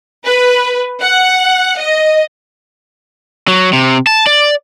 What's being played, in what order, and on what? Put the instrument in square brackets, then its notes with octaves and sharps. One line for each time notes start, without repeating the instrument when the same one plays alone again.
[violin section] B4
F#5
D#5
[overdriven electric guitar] F#3
C3
A5
D5